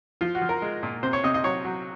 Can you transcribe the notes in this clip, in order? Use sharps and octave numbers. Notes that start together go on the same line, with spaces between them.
F3 F4
F#4
F3
A#4
G#3
A#2
C3 C5
C#5
C3 D#5
D#5
F#3 C#5
F#3